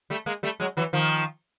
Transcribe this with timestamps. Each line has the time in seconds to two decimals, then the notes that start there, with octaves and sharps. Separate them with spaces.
0.10 G3 A3
0.26 G#3 A#3
0.43 G3 A3
0.60 F#3 G#3
0.77 E3 F#3
0.93 D#3 F3